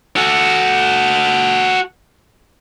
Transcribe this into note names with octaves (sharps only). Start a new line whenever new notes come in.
F#4 A4